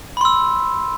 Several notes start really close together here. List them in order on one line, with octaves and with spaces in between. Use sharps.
B5 C6 E6